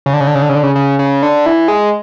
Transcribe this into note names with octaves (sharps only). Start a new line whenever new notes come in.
C#3
D3
C#3
D3
C#3
D3
C#3
D3
C#3
C#3
C#3
D3
E3
G#3